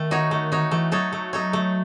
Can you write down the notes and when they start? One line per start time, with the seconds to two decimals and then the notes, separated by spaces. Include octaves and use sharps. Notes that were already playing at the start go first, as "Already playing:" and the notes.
Already playing: D#3 A3
0.11 D#4 F#4 C#5
0.31 A3
0.52 D#4 F#4 C#5
0.71 E3 A3
0.92 F#3 D#4 A4 C#5
1.13 A3
1.33 D#4 A4 C#5
1.53 A3